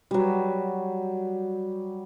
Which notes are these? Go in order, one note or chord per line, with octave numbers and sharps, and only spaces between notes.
F#3 G3